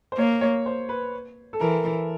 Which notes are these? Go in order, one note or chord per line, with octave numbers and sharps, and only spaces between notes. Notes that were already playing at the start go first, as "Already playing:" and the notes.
C5
A#3 C#5
C#5
C5
B4
A4
E3 A#4